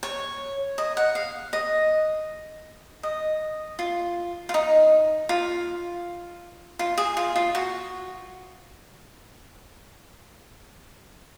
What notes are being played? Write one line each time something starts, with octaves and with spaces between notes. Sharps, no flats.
C#5
D#5
F#5
F5
D#5
D#5
F4
F4
D#4
F4
F4
G#4
F4
F4
F#4